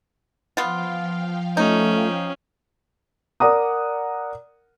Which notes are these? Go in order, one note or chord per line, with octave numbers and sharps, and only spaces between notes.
F3 B3 F4 F5 G5
A3 C#4 D#4
A#4 D5 F#5 A#5 D6 D#6